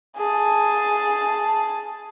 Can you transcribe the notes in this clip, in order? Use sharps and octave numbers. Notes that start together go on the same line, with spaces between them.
G#4 A5